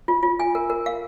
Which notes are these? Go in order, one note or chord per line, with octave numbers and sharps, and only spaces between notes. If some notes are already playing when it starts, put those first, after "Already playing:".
F4
F4
G#5
A#4
A#4
F5